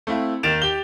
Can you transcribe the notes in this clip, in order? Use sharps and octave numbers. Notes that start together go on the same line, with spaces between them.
A3 C4 E4 F5
D#2 D#3 A6 D7 E7 F7
G4 G7